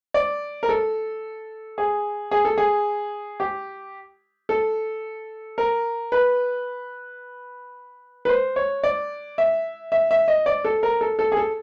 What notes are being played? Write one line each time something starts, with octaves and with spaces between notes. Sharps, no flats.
D5
A#4
A4
G#4
G#4
A4
G#4
G4
A4
A#4
B4
B4
C5
C#5
D5
E5
E5
E5
D#5
D5
A4
A#4
A4
A4
G#4
A4